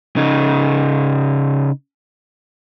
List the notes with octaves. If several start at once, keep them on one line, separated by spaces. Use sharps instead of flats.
C#3 D#4